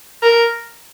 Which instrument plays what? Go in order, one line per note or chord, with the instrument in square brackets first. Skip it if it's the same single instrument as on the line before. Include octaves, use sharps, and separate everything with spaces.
[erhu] A#4